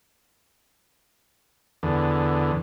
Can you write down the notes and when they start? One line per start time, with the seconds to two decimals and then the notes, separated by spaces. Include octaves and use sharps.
1.83 E2 D3